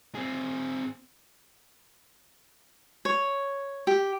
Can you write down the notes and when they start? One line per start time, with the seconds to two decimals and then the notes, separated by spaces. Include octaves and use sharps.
0.15 C4 G#4
3.05 C#5
3.87 G4